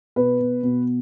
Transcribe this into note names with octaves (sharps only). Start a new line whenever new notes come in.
B2 B4
B2
B2